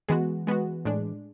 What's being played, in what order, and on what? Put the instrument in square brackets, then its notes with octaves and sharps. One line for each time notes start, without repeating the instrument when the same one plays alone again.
[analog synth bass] E3 [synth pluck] G#3 B3 F#4
[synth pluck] G#3 B3 F#4
A2 G#3 D4